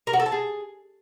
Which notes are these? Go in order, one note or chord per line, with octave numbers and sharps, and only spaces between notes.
A#4
F#4
A4
A5
G#4